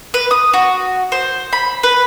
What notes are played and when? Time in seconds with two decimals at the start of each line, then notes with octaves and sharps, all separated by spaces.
0.14 B4
0.31 D#6
0.53 F#4
1.12 C5
1.53 B5
1.83 B4